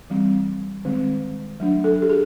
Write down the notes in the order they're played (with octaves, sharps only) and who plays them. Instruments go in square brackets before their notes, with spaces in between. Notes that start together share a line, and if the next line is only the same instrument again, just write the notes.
[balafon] E3 G3 C4
D#3 G#3 C4
F#3 A3 D4
A4
G4
G#4